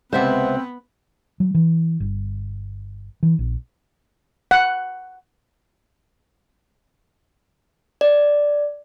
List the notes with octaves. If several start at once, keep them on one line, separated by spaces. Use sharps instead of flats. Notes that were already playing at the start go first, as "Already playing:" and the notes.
C#2 C3 B3 C4 B4 C5 E5 F#5
F#3
E3
G1
E3
A#1
F#5
D5